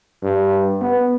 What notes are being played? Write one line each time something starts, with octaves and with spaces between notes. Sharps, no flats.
G2
B3